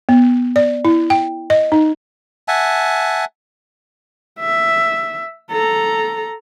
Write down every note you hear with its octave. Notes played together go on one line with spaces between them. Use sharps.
B3
D5
E4
G5
D#5
D#4
E5 F#5 G#5 A5
E5
A4 A#5